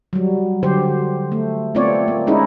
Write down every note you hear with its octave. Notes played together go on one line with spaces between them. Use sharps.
F#3 G3
D3 F#3 G4 C5
A3
A3 B3 C4 F4 C#5 D5
A#3
G#3 C4 C#4 D#4 E4 G#4